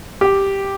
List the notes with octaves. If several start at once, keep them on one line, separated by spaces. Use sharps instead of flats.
G4